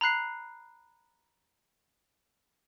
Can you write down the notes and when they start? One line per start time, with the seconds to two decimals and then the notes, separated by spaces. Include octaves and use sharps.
0.01 A#5 B5 F#6 C7